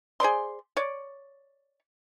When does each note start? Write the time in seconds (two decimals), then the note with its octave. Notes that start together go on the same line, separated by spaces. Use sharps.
0.20 G#4 C5 D5 C6
0.77 C#5 D5